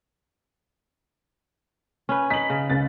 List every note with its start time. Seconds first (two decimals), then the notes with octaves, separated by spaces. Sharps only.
2.09 C#4 B4
2.30 D#4 B6 F#7
2.50 C#3
2.70 C#2 A6